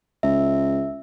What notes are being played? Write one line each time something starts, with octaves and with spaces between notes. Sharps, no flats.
C#2 E5